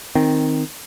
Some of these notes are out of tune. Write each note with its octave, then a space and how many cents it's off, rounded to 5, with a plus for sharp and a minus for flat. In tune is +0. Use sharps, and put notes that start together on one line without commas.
D#3 +0 C4 +0